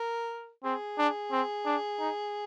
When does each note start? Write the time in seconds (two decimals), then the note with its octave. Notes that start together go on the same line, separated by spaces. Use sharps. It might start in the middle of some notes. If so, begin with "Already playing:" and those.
Already playing: A#4
0.64 C4 G#4
0.98 D4
1.32 C4
1.66 D4
1.99 D#4